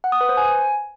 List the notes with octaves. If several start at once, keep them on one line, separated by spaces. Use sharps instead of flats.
F#5
D#6
B4
C5
G#5